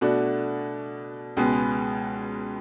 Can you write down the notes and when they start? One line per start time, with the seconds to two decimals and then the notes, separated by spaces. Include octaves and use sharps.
0.01 B2 A3 D4 F#4
1.37 C#2 B2 G#3 B3